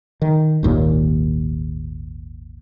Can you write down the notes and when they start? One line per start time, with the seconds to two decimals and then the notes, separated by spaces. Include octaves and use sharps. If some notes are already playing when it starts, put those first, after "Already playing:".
0.22 D#3
0.63 G#1 D#2 A#2